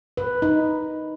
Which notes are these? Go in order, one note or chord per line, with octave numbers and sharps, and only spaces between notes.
B4
D#4